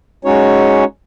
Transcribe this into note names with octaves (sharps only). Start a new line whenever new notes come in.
G#3 C#4 D#4 F#4 C#5